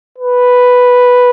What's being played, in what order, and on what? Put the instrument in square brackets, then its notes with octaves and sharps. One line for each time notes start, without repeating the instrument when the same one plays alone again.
[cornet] B4